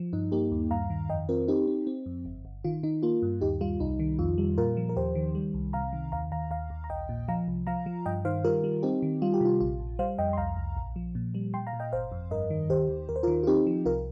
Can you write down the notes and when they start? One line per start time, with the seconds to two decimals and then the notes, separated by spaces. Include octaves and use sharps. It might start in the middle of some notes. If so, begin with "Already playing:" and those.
Already playing: F3
0.13 G2 D#4
0.32 A#3 D#4 G4
0.52 D#2
0.71 G2 F5 A#5
0.90 D#3
1.09 F2 D#5 G5
1.29 C4 F4 A#4
1.48 C4 D#4 G4
1.67 C4
1.87 C4
2.06 F2
2.25 G1
2.45 G1
2.64 D#3 F4
2.83 D#3 D#4
3.03 A#3 F4
3.22 G2
3.41 D#2 D#4 G4
3.61 G3 F4
3.80 C2 D#4
4.00 D#3
4.19 F2 F4
4.38 G3
4.58 A#2 F4 A#4
4.77 F3
4.89 A#4
4.96 D#2 G4 C5
5.15 D#3
5.35 G3
5.54 C2
5.73 C3 F5 A#5
5.93 D#3
6.12 D#2 F5 A#5
6.31 D#2 F5 A#5
6.51 D#2 F5 A#5
6.70 D#2
6.84 A#5
6.90 A#1 D#5 G5
7.09 A#2
7.28 F3 F5 A#5
7.48 C2
7.67 F3 F5 A#5
7.86 F3
8.06 G2 D#5 G5
8.25 D#3 C5 F5
8.44 G3 F4 A#4
8.64 G3
8.83 C4 D#4 G4
9.02 D#3
9.22 G3 F4
9.34 G4
9.41 C3 F4
9.60 A#1 F4
9.80 A#1
9.99 G3 C5 F5
10.18 F2 D#5 G5
10.33 C6
10.37 C2 F5 A#5
10.57 C2
10.77 A#1
10.96 F3
11.15 A#2
11.34 G3
11.54 A#2 G5 C6
11.67 F5 A#5
11.73 A#2
11.80 D#5 G5
11.92 G1 C5 F5
12.12 F2
12.31 G2 A#4 D#5
12.50 D#3
12.70 D#2 G4 C5
12.89 D#2
13.09 D#2 A#4
13.16 C5
13.23 F4 A#4
13.27 D#3
13.43 F4
13.47 C4 D#4 G4
13.67 F3
13.85 C2 F4 A#4